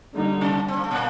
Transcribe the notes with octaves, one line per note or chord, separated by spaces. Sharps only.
D3 G3 A#3 D#4
C3
C4
A#3
A3
A#2 A#3